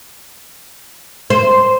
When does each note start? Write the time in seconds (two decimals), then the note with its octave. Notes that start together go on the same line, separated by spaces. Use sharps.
1.30 C5